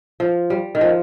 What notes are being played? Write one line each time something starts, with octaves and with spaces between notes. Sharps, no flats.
F3
G3
D#3
F3